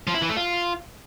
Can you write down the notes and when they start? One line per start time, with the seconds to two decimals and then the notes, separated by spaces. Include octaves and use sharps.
0.07 F3
0.15 E4
0.22 E3
0.29 A3
0.37 F4